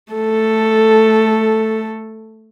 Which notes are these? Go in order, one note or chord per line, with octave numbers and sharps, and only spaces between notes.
A3 A4